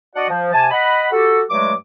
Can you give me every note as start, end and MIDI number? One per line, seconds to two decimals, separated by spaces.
0.15 0.26 62
0.15 0.26 66
0.15 0.26 74
0.15 0.26 75
0.15 0.26 78
0.29 0.51 53
0.53 0.68 48
0.53 0.68 80
0.53 0.68 81
0.71 1.07 75
0.71 1.07 78
0.71 1.07 83
1.12 1.42 66
1.12 1.42 67
1.12 1.42 69
1.50 1.73 43
1.50 1.73 54
1.50 1.73 56
1.50 1.73 57
1.50 1.73 86